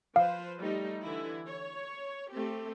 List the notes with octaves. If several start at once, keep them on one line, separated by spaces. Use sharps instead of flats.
F3 B4 C5 F5
G3 A3 D#4
D3 E3 E4
C#5
A3 C4 G4